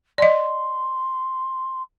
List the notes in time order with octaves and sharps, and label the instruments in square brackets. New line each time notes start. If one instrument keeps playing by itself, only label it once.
[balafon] D5 D#5 [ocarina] C6